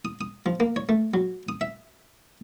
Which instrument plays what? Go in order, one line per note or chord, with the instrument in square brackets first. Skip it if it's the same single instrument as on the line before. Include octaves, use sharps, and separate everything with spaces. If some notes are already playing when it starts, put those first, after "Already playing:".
[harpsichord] D#6
D#6
F3
A#3
C#5
A3
F#3
D#6
E5